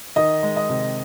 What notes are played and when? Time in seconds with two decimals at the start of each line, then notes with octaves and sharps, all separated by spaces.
0.16 D#3 D#5
0.43 G#3
0.56 D#5
0.69 C3